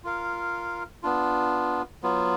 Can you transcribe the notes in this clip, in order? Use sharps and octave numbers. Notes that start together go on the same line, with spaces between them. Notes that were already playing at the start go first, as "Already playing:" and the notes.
F4 A#4 F5
B3 D4 F4
F#3 B3 F4